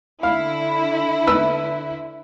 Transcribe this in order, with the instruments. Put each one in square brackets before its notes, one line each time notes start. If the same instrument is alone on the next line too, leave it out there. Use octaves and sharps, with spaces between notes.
[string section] D3 E4 [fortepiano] F5
[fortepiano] B4 E6